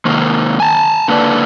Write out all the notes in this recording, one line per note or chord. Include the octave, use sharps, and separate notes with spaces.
C3 D#3 A#3
G#5 A5
D3 A#3 B4 D5